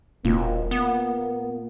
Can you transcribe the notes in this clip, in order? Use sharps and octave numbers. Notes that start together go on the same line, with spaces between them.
E1 A#2 A#3
B3